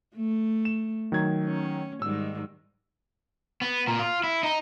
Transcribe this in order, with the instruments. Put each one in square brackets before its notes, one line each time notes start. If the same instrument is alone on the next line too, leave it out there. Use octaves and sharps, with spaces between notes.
[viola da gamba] A3
[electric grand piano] E7
D#3 F#3 G#6
[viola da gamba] C#4
[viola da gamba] G#2 D#3 G3 [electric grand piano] E6
[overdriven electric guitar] B3
A#2
F4
E4
D#4